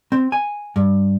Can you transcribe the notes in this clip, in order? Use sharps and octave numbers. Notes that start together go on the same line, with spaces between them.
C4
G#5
G2